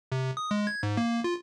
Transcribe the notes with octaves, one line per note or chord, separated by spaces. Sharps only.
C3
D#6
G#3
G#6
G#2
A#3
F4